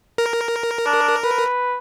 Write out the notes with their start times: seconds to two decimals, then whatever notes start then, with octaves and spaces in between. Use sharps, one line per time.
0.18 A#4
0.86 D4
1.24 B4